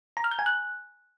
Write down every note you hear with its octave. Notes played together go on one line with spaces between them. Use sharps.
A#5
F6
G6
G#5
F#6